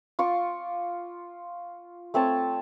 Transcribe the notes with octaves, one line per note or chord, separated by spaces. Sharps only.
F4 C#6 D6
A3 C4 C#5 A5